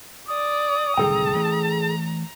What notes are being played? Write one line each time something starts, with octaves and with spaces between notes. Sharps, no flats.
D5 D#6
D1 C2 D#3 G#4 A4 G5 A#5
E3 A3